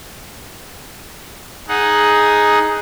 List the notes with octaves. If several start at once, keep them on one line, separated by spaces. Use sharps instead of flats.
D#4 G#4 F#5